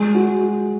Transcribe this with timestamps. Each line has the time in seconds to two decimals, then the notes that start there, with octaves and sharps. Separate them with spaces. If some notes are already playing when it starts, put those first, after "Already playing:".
Already playing: G#3
0.15 F#4